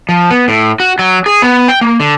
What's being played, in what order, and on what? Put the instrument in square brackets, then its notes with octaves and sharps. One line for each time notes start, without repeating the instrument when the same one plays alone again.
[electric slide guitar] F3
B3
A2
F#4
F#3
G#4
B3
G5
A#3
D3